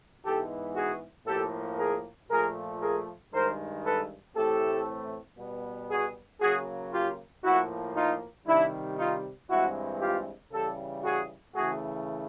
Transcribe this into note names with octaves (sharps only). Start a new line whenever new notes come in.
G#2 E3 G#3 B3 G4 A4
F#4 G#4
A2 F3 A#3 G4 A4
G#4 A#4
A#2 F3 A3 G#4 A#4
G#4 A#4
G2 D#3 G#3 A#4 C5
A4 B4
A2 E3 A3 C4 G4 A4
B2 G3 B3
F#4 G#4
C#3 F#3 A#3 F#4 G#4
F4 G4
A2 F3 A#3 E4 F#4
D#4 F4
C3 D#3 G3 D4 E4
D#4 F4
G2 E3 G#3 C4 E4 F#4
F4 G4
C#3 E3 G3 G4 A4
F#4 G#4
C#3 E3 A3 F#4 G#4